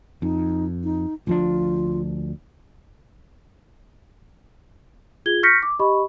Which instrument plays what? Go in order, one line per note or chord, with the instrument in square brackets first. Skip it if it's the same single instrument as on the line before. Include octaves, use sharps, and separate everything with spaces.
[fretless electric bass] F2 [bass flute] D#4
[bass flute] D#4
[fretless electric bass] D2 F3 D4 [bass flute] F4
[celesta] F4 G#4 G#6 G7
C#6 F6 G6 A#6 B6 C#7
D6
G4 D#5 B5 C#6